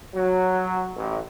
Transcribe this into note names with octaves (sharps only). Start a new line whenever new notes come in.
F#3
A1